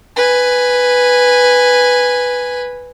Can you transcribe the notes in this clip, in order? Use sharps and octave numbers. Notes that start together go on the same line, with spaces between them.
B4 G#5